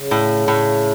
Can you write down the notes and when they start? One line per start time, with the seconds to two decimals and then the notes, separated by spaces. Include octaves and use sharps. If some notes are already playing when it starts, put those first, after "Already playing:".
Already playing: C#3
0.11 A2
0.48 A2